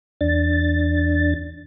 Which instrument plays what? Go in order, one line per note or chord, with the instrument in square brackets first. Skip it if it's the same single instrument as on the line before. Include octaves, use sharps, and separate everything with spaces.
[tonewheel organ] E2 D4 A6